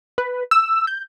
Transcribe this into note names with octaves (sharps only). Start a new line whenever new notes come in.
B4
E6
G6